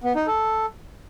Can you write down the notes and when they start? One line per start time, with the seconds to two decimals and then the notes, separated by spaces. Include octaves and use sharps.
0.04 B3
0.15 D#4
0.27 A4